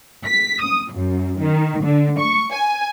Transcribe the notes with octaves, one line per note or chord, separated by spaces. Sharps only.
B6
D#6
F#2
D#3
D3
C#6
G#5